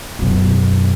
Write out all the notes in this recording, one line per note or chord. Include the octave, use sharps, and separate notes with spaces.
F#2 B2